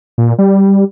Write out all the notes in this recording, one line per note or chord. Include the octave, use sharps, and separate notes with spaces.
A#2
G3